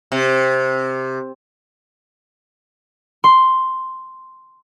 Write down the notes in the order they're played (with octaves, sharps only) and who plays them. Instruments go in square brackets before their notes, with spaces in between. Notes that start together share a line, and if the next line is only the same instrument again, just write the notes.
[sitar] C3
[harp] C6